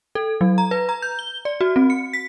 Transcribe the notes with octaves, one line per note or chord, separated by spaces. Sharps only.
A4
F#3
A#5
B4
A#5
G6
G7
D5
F#4
C4
C#7
B6